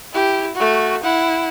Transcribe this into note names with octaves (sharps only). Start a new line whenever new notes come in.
E4 G4
A3 F#4
E4 F#5